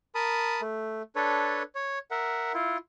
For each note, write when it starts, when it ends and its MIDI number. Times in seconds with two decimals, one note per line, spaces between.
0.15 0.61 70
0.15 0.61 81
0.15 0.61 83
0.15 0.61 87
0.61 1.02 57
1.16 1.63 62
1.16 1.63 69
1.16 1.63 71
1.16 1.63 73
1.75 1.99 73
2.11 2.52 70
2.11 2.52 76
2.11 2.52 78
2.54 2.77 64
2.54 2.77 65